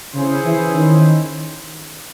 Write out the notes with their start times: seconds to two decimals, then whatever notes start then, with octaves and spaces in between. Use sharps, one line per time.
0.15 C#3 C#4 E4 G#4 C5
0.44 E3
0.73 D#3